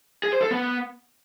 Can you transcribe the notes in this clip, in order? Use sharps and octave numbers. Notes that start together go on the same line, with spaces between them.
G#4
C5
A4
B3